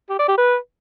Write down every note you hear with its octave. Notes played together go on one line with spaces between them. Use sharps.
G4
D5
G4
B4